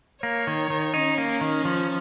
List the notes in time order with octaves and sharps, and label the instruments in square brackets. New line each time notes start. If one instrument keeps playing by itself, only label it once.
[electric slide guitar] A#3 [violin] C#5
[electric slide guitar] D#3
D#3
[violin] C#4 [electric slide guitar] D#4
[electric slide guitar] A#3
D#3
F3